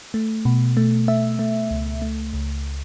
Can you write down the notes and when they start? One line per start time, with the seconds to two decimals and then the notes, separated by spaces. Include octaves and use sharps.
0.14 A3
0.45 B2
0.77 A3
1.08 A3 E5
1.39 A3
1.71 C#2
2.02 A3
2.33 C#2